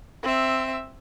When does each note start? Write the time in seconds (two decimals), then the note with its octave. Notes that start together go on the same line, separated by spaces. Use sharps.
0.23 C4 E5